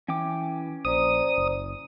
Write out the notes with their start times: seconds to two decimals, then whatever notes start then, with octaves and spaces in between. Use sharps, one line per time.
0.08 E3 C#4 G5 D6
0.85 A#1 C5 D5 A#5 D#6
1.37 F#1